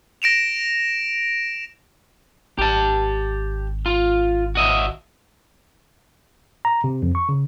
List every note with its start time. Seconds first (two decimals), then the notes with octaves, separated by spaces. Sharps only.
0.22 A#6 D7 E7 F7
2.59 G#1 G4 A5
3.86 F4
4.55 F#4 D#5 E5
6.65 A#5
6.84 C3
7.03 F2
7.15 C#6
7.29 C#3